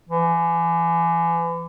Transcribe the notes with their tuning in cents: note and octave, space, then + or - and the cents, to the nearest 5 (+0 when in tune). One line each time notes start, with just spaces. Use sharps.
E3 +35